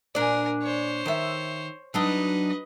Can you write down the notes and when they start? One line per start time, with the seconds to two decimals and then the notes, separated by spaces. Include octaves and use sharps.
0.15 A#2 D4 A#4 D5 G#5
0.62 C5 C#5
1.06 D#3 E5
1.94 F#3 D4 D#4 B4 D#5